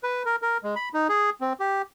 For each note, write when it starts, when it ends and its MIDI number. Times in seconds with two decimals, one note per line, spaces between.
0.03 0.23 71
0.25 0.36 70
0.42 0.58 70
0.63 0.75 56
0.76 0.89 83
0.94 1.08 63
1.09 1.30 68
1.41 1.53 60
1.60 1.82 67